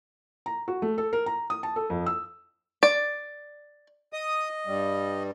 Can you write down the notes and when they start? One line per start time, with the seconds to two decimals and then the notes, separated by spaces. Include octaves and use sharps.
0.46 A#5
0.68 F#4
0.82 A3
0.98 A4
1.13 A#4
1.26 A#5
1.50 D#6
1.63 A5
1.76 A4
1.90 F2
2.06 E6
2.83 D5
4.13 D#5 D#6
4.67 G2 G3